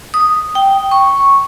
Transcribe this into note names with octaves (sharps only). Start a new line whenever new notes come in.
D#6
G5
C#6